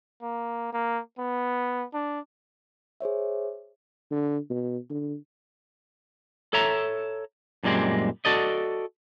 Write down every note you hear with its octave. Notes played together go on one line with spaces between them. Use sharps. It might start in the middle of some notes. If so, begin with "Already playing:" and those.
A#3
A#3
B3
D4
G#4 C5 C#5 E5
D3
B2
D3
A4 C#5 E5 A#5
F#2 A#2 G3 G#3 C4
F#4 A4 D5 D#5